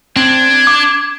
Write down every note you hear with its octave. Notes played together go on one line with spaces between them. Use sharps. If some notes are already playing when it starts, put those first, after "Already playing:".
C4 D4 G#6
D6